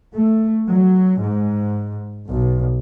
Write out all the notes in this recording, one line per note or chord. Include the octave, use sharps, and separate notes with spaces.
A3
F#3
G#2
B1